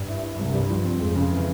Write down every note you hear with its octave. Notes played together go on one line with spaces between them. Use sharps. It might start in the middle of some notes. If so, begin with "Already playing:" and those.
Already playing: G2
E4
E4
C2 G2
G3
F3
C4
F2 G#3
C#3
E3